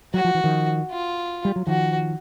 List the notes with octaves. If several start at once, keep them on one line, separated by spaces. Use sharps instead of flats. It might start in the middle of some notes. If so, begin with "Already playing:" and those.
F#3 F#4
F3
E3
D#3 F3
F4
G3
F#3
D#3 F3 F#4